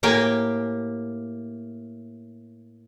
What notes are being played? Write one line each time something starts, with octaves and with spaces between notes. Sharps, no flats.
A2 A#3 G4 G5 G#5